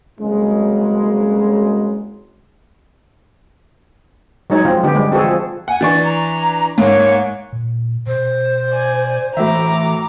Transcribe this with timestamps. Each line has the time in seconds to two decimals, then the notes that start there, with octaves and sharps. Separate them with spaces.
0.19 F#1 C2 C#3 F#3 G#3
4.50 F#3 G#3 D#4 C#5
4.65 F3 C4 F4
4.83 D3 B3 G4
4.95 G3 G#3
5.12 C4 F#4 G#4 A4
5.24 F3
5.68 F#5 G#5
5.81 E3 D4 C#6 A6
6.04 A#5
6.78 G#2 A#3 C#5
7.53 A#2
8.07 B2 C5
8.70 D5 G#5
9.37 A2 E3 F#4 E5 A#5 D6